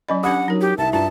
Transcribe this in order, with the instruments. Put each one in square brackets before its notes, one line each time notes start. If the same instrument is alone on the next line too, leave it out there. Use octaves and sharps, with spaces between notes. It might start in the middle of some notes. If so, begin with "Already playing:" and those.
[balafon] F#3 C#4 D5 [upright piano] D#5 B5
[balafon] C#4 D4 G4 [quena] F#5 [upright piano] B5 D6 D#6
[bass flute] F#3 [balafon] D#4 A#4
[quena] G4
[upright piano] C2 [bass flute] E5 [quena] A5
[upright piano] G2 [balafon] F4 A#5 [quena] A5